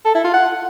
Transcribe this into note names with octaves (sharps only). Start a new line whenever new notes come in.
A4
E4
F4
F#5